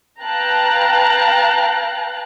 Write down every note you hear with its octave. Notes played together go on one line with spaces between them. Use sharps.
B4 F5 G5 A5 A#5 F#6